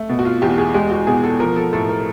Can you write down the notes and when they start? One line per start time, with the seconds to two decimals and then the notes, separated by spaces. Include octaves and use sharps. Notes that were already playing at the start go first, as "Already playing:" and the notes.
Already playing: A3
0.09 B2
0.19 F#4
0.25 F4
0.42 E2 G4
0.58 G#4
0.74 G#3 G4
0.91 F#4
1.07 B2 G#4
1.24 A4
1.40 F3 A#4
1.56 A4
1.73 A2 A4
1.89 A#4